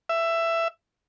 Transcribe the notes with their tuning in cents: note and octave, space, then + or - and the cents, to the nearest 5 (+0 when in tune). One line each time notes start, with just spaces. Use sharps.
E5 +15